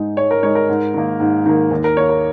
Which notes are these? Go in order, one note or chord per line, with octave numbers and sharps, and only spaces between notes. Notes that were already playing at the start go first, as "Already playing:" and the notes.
Already playing: G#2 G#3 D#4
G#2 C#5
A#4
G#3 D#4 C#5
A#4
G#2
D#3 A#3
G#2
D#3 A#3
D#2
A#4
D#3 A#3 C#5
A#4